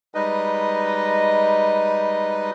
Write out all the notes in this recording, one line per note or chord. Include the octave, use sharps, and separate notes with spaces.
G3 G#3 D#4 B4 D#5